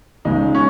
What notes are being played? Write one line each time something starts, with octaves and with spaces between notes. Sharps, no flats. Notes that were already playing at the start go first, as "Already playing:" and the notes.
C#2 C#3 G#3 D#4
C#4